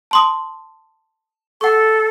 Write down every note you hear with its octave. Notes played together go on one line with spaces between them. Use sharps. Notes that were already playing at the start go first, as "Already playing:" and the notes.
A5 C6 D#6
A4 F#5 C#6